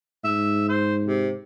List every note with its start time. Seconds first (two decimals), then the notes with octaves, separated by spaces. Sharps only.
0.24 G#2 E5
0.69 C5
1.06 C3